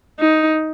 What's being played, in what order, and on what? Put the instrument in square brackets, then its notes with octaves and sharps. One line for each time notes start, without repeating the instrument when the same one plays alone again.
[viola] D#4